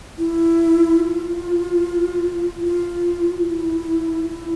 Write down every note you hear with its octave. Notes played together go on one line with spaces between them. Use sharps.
E4
F4
F4
F4
E4
E4